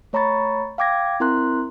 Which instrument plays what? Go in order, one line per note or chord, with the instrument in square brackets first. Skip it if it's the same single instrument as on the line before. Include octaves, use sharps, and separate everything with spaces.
[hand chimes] A3 C#5 A#5 B5 C#6 A6
F5 G5 D6 G#6 A#6
C4 E4 A#4 A#5 C6 F#6